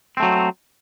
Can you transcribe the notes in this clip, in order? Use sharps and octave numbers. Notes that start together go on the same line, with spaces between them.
F#3 A3 C4